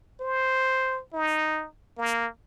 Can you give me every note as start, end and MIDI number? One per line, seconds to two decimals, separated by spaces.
0.21 1.01 72
1.14 1.66 63
1.98 2.28 58